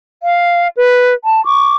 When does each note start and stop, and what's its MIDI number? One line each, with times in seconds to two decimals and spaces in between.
0.22 0.67 77
0.76 1.12 71
1.25 1.44 81
1.44 1.76 85
1.44 1.76 86